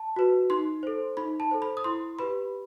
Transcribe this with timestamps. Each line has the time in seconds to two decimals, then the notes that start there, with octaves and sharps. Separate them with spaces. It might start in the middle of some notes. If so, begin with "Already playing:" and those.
Already playing: A5
0.16 F#4 B4
0.50 D#4 C6
0.83 A4 C5
1.17 D#4 B5
1.40 A5
1.51 A4 C5
1.62 B5
1.77 D#6
1.84 E4 C6
2.19 G4 B4 B5